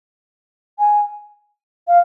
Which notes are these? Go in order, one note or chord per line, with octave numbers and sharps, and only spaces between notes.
G#5
F5